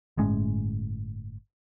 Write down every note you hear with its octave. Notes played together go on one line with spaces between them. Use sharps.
G1 A2 G#3 C#4